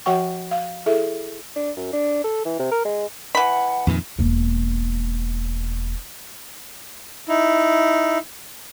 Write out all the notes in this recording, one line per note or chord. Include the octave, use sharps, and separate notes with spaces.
F3 F#4 C#5 F#5 G5 C#6
F5
E4 G#4 A4 E5
D4
F#2
D4
A4
E3
C3
A#4
G#3
E3 F#5 B5
F2 A#2 D#3
E1 A#3
D#4 E4